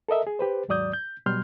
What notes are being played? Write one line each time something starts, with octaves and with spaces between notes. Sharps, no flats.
A4 A#4 D#5 E5
G#4
G4 B4 C5
D#2 G#2 F#3 D5 D#6 G6
G6
B2 F#3 G3 C6 F6 G6